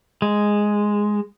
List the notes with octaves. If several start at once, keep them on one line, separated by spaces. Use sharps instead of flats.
G#3